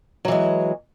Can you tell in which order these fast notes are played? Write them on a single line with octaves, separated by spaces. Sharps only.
F#3 E3 G#3